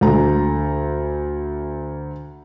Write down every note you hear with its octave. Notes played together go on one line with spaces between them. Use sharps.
D2 A#5